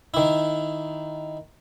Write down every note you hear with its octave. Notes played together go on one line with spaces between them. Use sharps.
D#3 E4